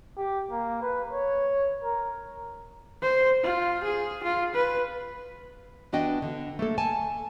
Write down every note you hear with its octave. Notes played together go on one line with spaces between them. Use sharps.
G4
A#3
B4
C#5
A#4
C5
F4
G#4
F4
B4
E3 B3 D4 F#4 D#5 G5
D3
A3 A#3 A4
G#5 A5